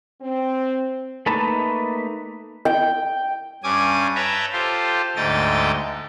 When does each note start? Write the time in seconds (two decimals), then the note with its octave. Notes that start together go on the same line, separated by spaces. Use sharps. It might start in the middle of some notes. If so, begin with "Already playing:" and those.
0.22 C4
1.26 A3 A#3 D#4 B4 A5
2.65 G5
3.64 G2 C#4 G#5 D6 D#6
4.15 B4 C#5 E5 G5 A5 A#5
4.53 F4 G4 A4 C5
5.16 D2 G#2 A3 D#5 G5 A6